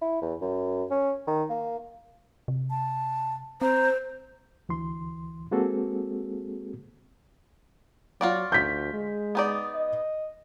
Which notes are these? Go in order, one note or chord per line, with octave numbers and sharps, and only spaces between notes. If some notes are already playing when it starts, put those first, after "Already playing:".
E4
E2
F#2
C#4
D#3
A#3
C3
A5
C4 C5 A#5
D2 E3 C6
G#3 A#3 C4 F#4 G#4 A4
F#3 F4 F#4 D5
D2 G6 B6
G#3
B3 D#4 D5
D#5